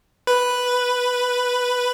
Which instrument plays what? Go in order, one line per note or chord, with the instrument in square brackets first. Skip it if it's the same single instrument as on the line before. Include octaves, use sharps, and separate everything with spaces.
[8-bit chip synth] B4